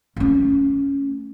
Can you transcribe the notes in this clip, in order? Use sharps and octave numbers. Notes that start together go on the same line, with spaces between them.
A3 C#4